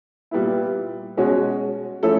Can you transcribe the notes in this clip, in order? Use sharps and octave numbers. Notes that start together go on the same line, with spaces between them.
A#2 G3 B3 E4
B2 G#3 C#4 F#4
F3 A3 C#4 E4 A4